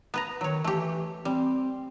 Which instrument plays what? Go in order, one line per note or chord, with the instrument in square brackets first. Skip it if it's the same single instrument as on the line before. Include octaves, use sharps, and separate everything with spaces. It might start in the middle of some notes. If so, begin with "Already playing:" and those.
[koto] B3 B4 A#5
[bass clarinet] D#3 [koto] F#3 C#5
[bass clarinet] E3 [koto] A3 G4
[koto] G3 [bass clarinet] C4